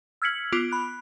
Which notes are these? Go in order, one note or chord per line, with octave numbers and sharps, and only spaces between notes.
E6 F6 G#6 B6 C#7 F#7
B3 F4 D6 D7
B5 F#6